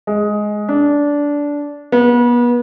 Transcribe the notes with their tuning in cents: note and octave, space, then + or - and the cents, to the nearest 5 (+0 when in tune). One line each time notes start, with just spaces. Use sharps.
G#3 +10
D4 -15
B3 -35